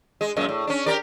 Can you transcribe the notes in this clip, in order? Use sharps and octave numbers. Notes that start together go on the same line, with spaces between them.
G#3
F#2 A#2 G#3
A2
C#4 D4
G4 A#4 D5